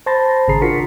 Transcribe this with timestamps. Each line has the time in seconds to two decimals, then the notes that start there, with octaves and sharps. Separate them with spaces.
0.06 C5 A5 B5 C6 A6 A#6
0.48 G#1 C#3 G#4 A#5 C7
0.61 D4 F4 F#4 A#4 B6 C#7